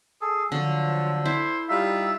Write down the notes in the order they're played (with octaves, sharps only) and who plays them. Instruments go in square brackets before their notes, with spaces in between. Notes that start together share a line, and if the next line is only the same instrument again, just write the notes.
[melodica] G#4 A4
[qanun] D3 [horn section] F3 F#3 [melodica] E6
[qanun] E4 [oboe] C5
[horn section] G3 F4 [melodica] D#4 [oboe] E5